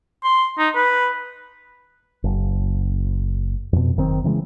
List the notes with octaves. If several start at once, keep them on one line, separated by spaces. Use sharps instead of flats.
C6
D#4
B4
F#1
F2 B2
F#1 D#3 C4
C#3 E3 G3 G#3